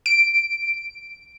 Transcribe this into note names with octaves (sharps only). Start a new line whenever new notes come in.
D7